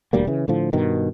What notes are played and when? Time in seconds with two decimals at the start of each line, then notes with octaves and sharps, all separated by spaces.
0.13 E1 D2 G3 A#3
0.27 C#3 E3
0.48 A2 D3 F3
0.73 G2 B2 D#3